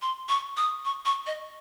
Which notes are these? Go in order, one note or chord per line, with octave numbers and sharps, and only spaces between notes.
C6
C#6
D#6
C#6
C#6
D#5